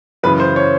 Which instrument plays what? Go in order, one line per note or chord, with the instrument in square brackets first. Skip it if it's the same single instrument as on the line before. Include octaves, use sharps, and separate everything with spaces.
[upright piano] F#2 C#3 E3 B4
C5
C#5